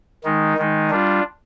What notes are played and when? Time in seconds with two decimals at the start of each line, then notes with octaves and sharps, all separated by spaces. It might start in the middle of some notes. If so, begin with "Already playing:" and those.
0.24 D#3 G#3 D#4
0.57 D#3 G#3 D#4
0.90 G3 D4 F4